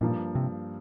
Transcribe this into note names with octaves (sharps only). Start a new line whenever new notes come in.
G2 A#2 F3 A#3
C3